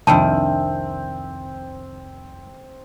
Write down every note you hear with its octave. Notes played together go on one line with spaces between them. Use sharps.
C2 F2 D#3 C4 D4 E4 A5